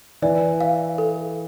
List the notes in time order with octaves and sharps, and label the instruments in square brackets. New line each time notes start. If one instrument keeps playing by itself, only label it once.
[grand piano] E3 [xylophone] D5
[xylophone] F5
A4